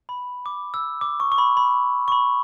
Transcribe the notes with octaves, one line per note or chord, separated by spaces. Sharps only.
B5
D6
E6
D6
C#6
C#6
B5
B5
C#6
B5